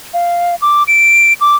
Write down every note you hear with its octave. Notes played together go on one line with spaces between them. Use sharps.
F5
D6
D7
D6